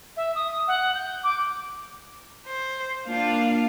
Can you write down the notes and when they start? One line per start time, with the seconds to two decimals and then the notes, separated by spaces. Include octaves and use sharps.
0.16 E5
0.35 D#6
0.67 F#5
0.94 G6
1.23 D6
2.46 C5
3.07 A#3 D4 F4 F5